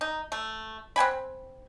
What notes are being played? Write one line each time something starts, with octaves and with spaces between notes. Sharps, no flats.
D#4
A3
C4 F#5 G#5 B5